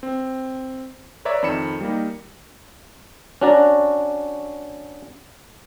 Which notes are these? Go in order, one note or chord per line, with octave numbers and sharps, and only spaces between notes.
C4
B4 C#5 D5 E5 A#5
F2 D#3 B5 C#7 E7
G3 A#3 D#4
C#4 D4 F#4 D5 A#5